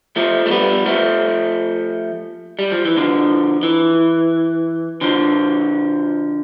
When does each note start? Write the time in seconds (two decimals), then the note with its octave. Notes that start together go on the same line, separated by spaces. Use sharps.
0.16 F3 A3
0.46 A3
0.51 G3 B3
0.86 F3 A3
2.59 G3
2.72 F3
2.85 E3
2.97 D3 F3
3.63 E3
5.01 D3 F3